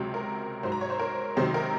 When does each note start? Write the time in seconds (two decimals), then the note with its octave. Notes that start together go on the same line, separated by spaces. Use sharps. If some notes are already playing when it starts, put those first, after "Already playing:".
Already playing: C#2 C3 F#3
0.14 A#4
0.63 G#2 F#3 C5
0.72 A#5
0.81 C#5
0.90 C5
1.00 A#4
1.36 C#2 C3 D#3 F#3 C5
1.54 A#4